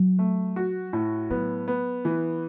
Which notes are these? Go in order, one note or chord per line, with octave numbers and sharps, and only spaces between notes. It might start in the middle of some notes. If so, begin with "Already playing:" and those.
Already playing: F#3
A3
F#4
A2
F#3 B3
B3
E3